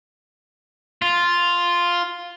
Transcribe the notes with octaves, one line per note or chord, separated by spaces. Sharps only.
F4